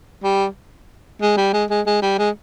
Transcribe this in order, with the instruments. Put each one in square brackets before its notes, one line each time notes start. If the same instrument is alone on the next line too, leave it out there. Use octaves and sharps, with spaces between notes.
[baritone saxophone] G3
G#3
G3
G#3
G#3
G#3
G3
G#3